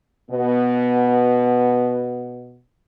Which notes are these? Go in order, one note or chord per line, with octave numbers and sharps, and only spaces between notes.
B2 B3